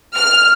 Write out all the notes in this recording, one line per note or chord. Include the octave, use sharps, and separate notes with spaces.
F6